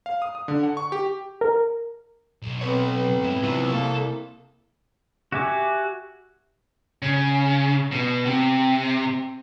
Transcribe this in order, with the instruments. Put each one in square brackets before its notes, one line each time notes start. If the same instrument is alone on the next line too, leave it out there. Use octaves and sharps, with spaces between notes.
[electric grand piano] F5
D#6
D#6
D3
F#5
C#6
G4
[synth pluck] A#4
[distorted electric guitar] B1
[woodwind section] B3 C4 [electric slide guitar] B4 C#5
[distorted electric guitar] G#2 E4
[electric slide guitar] C3 E4 [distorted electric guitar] F3 F#3
[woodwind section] A#3 [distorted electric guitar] A4
[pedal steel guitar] F#4 G4 E5 G#5 D6
[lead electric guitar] C#3
B2
C3